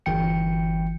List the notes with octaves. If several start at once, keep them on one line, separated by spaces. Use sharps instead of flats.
G1 E3 G5 C#7